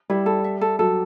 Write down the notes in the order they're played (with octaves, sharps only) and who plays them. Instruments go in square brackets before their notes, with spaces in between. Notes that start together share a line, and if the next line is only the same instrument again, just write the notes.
[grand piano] G3 [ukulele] E4
[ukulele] A4
E5
A4
[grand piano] F#3 [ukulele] A4